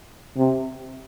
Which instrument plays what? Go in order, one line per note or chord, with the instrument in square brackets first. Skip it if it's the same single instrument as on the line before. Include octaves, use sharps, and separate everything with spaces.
[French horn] C3